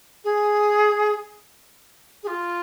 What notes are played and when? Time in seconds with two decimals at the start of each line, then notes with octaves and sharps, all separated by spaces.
0.24 G#4
2.23 G#4
2.27 F4